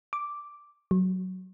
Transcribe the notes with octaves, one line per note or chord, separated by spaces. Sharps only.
D6
F#3